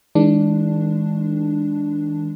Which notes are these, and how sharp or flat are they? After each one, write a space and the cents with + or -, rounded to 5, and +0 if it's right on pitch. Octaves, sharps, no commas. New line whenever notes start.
D#3 +45 G#3 -15 D4 +0